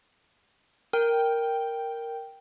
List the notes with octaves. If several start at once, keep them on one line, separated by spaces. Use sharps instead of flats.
A#4 G5